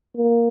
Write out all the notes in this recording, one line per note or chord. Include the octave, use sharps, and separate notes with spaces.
A#3